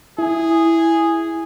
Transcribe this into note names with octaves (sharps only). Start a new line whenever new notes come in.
E4 G#4